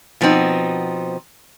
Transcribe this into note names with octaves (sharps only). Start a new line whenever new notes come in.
B2 F3 B3 C4 D#4